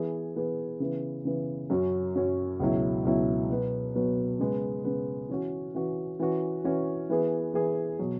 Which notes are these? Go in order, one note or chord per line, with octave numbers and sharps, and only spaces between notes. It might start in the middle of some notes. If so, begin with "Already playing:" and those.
Already playing: E3 B3 G#4
E3 B3 G#4
C#3 E3 B3
C#3 E3 B3
F#2 F#3 C#4 F#4
F#2 F#3 C#4 F#4
C#2 B2 F#3 E4
C#2 B2 F#3 E4
B2 F#3 B3
B2 F#3 B3
C#3 G#3 B3
C#3 G#3 B3
E3 C#4 F#4
E3 C#4 F#4
E3 C#4 F#4
E3 C#4 F#4
E3 B3 G#4
E3 B3 G#4
B2 F#3